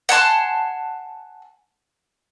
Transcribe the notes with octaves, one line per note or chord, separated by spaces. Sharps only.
F#5 G#5 A5 C6